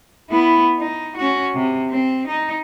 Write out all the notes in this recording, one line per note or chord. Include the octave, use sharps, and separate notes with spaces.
B3 E4
D#4
C#4 F#4
C3
C4
D#4